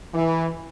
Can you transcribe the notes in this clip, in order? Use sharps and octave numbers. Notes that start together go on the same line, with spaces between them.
E3